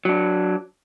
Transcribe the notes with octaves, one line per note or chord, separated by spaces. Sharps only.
F#3 D4